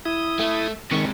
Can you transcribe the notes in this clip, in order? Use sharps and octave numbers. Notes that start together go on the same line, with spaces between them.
E4 D#6
A3
C3 D#3 G#3 C#6